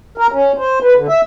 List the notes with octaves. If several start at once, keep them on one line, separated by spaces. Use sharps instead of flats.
A#4
C#4
C5
B4
D3
E5